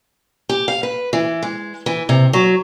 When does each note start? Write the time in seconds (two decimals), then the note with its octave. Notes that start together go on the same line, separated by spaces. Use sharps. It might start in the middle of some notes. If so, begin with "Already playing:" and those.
0.49 G4
0.68 F5
0.83 B4
1.13 E3
1.43 G#3
1.86 E3
2.09 C3
2.33 F#3